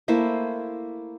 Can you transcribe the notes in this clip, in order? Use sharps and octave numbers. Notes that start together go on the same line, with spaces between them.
A3 A#3 E4 C5